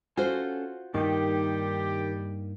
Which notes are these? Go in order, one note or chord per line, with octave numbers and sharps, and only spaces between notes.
C#4 F4 F#4 A4 C5 G#5
G2 D#3 G3 A#3 D#4 G4